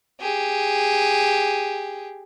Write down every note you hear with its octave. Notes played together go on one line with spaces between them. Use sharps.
G4 G#4